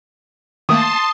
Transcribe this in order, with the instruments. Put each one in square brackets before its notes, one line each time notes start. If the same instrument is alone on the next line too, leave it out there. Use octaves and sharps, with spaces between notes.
[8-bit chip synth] D#3 A3 A#3 [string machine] A5 C6 [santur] D#6